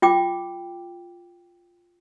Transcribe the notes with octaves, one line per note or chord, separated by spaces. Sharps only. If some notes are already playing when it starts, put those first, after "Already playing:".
F4 G5 D6